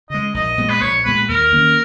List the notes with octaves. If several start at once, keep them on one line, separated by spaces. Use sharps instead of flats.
C#3 G#3 D#5
A#1 D#5
A#2 G#3 B3
B4
A#1 C#5
A#2 G#3 B3 B4
D#2 A#4
D#3 A#3 C#4